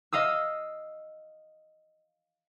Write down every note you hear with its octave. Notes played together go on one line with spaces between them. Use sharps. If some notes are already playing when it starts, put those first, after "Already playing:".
D#5 F5 D#6 E6